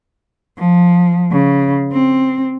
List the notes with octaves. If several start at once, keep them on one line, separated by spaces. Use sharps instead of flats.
F3
C#3
C4